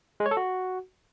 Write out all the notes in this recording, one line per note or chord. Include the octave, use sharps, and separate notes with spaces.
G#3
C#5
A4
F#4